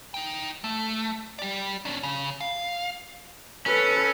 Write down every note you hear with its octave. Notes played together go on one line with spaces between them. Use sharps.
D#4 G5
A3
G4 D5
C#4 D4
C#3
F5
C#4 A4 B4